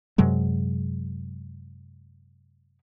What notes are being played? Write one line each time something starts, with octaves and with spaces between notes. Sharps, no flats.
F#2 C3 F#3 G#3